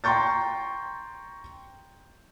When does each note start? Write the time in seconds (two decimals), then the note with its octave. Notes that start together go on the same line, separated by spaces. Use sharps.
0.04 G5 A#5 C6 C#6 G6 A6